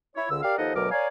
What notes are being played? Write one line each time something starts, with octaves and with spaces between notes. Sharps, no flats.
E4 C#5
C#2 D3 E6
G4 A#4 D5 F5 F6
D#2 F3 D#4 A4 D#5 F#5
D2 B2 F#3 A#4 D6 F6
A#4 C#5 D5 F5 G#5